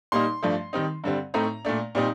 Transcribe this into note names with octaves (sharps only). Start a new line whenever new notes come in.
A#2 G3 A#3 D#4 C6
G2 F3 A3 D4
D#3 G3 C4 D#4
G2 D3 G3 C4
A2 A3 C4 D#4 A#5
A#2 A3 D4
A#2 G3 C4 D#4